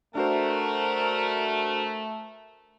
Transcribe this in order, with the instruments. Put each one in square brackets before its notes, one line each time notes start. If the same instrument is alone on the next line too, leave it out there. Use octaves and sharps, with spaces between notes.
[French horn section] A3 [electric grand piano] D4 F#4 C5 [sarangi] A#4